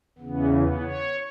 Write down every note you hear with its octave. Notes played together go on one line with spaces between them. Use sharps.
E2 C#3 E3 B3
B3
C#5